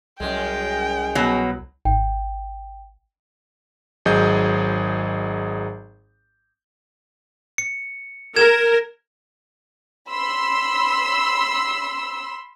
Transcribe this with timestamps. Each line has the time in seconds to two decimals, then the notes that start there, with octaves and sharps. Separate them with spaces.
0.20 C2 F#2 G#3 G5
1.15 B2 F#3
1.85 G#1 G5
4.05 G#1 F#3 G#4 D#5 G6
7.58 C#7
8.36 A#4 G#6 E7
10.10 B5 C6 E6